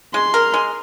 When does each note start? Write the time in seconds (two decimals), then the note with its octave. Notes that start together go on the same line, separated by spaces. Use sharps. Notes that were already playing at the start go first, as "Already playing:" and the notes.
0.14 G#3 C6
0.34 A#4
0.54 G#3